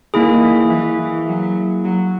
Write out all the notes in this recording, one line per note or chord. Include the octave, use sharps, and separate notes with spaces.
D#3 A#3 E4 G#4
E3
E3
E3
F#3
F#3